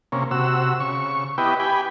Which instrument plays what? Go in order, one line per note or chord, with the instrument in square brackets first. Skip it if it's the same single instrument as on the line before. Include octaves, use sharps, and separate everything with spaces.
[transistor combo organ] C3 A#3 C#4
C3 F#4 E6
C#3 C#6
B3 E4 G4 B4 D#5 G5
G4 G5 G#5 B5